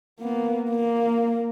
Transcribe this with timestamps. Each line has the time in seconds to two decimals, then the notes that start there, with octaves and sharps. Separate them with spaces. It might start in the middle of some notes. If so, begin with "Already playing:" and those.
0.20 A#3 B3
0.70 A#3